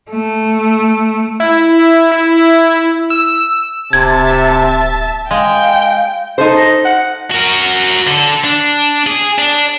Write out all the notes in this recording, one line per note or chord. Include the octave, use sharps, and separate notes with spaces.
A3
E4
E4
E6
D1 C3 E5 A5 G#6
G#3 F5 G5
D#4 A4 C5
D#5
F#5
F#4 A#4
D3 A4
D4
G#4
D4